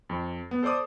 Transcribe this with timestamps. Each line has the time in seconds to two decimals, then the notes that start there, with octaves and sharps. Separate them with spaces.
0.09 F2
0.51 B3
0.63 A4 C5 D5 D6 D#6